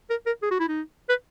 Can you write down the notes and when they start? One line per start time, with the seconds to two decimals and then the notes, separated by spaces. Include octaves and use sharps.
0.10 A#4
0.26 A#4
0.43 G#4
0.51 F#4
0.60 E4
0.69 D#4
1.09 B4